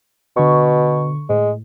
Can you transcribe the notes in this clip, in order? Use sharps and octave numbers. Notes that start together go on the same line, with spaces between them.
B2 D3 C#6
A2 G#3